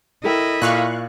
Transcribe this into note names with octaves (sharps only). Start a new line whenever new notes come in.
E4 A4 A#4 D#5 G5
A#2 F5 C#6 F#6